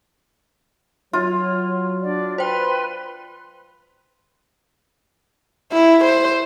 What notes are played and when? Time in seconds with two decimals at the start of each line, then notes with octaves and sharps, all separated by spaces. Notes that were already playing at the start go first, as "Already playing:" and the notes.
1.13 F#3 F4 C#5
2.02 D4 D5
2.38 B4 C5 G5 C6
5.73 E4
6.04 C5